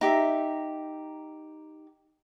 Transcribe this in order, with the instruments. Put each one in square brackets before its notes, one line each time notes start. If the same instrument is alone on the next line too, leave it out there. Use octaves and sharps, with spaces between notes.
[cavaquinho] D#4 G4 E5